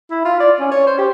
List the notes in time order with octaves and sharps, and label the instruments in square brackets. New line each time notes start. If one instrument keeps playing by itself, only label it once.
[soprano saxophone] E4
F4
D5
C#4
C#5
C5
G4